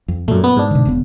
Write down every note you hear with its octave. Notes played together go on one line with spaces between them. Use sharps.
F2
F#2 A#2 A3
B3
G#2 D4
B2 D3
E1 C#3 B3